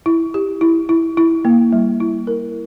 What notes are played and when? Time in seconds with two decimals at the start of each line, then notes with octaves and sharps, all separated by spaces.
0.06 E4
0.34 G4
0.61 E4
0.89 E4
1.17 E4
1.45 A#3
1.73 G3
2.00 E4
2.27 A#4